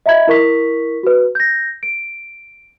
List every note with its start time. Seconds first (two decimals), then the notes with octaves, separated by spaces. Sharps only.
0.06 D#5 E5 A#5 B5 G#6
0.27 E4 A#4 C#6 B6
1.03 F#4 B4
1.35 G6 A#6
1.83 D7